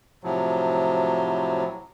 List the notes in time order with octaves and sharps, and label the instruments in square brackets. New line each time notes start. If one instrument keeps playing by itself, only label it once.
[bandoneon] A2 C3 F3 F#3